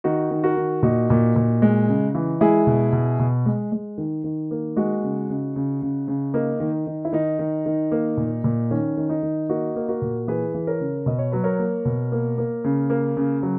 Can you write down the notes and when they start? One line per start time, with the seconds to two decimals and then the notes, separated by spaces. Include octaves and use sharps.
0.04 D#3 D#4 F#4
0.31 D#3
0.43 F#4 A#4
0.56 D#3
0.83 A#2 D#4 F#4
1.10 A#2
1.36 A#2
1.62 G#3
1.88 C#3
2.15 E3
2.41 G#3 E4 G#4
2.67 B2
2.93 B2
3.19 B2
3.46 G#3
3.72 G#3
3.98 D#3
4.24 D#3
4.51 A#3
4.76 G#3 D#4 F#4
5.03 C#3
5.30 C#3
5.56 C#3
5.82 C#3
6.08 C#3
6.34 A#3 D#4
6.60 D#3
6.87 D#3
7.05 E4
7.12 D#3 D#4
7.39 D#3
7.66 D#3
7.92 A#3
8.17 A#2
8.44 A#2
8.71 D#3 C#4
8.97 D#3
9.09 D#4
9.23 D#3
9.49 A#3 D#4 F#4
9.76 A#3
9.89 F#4 A#4
10.02 A#2
10.28 E3 G#4 B4
10.54 E3
10.67 A#4 C#5
10.80 C#3
11.06 B2 D#5
11.19 C#5
11.32 F#3 B4
11.44 A#4 C#5
11.59 A#3
11.85 B2
12.12 A#3
12.38 A#3
12.64 C#3
12.90 A#3
13.17 C#3
13.43 F#3